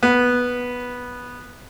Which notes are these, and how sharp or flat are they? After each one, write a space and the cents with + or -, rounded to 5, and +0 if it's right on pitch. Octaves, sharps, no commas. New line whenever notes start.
B3 -5